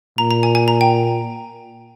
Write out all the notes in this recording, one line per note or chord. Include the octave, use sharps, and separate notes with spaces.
A#2 A#5
A#5
G#5
G#5
A#5
G5